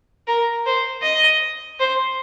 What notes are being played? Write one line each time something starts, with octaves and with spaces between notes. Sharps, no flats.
A#4
C5
D#5
C5